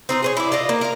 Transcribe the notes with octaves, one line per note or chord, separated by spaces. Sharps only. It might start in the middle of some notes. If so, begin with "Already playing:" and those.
C4 D#4 F4
G#4 C5 C#5
E4 D5
F4 D5 D#5
A#3
A#4 F5